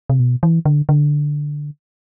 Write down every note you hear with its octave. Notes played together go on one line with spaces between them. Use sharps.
C3
B2
E3
D3
D3